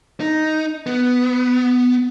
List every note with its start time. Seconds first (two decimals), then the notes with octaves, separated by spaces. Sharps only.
0.20 D#4
0.86 B3